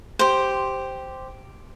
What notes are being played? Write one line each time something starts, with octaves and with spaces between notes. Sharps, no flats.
G4 C5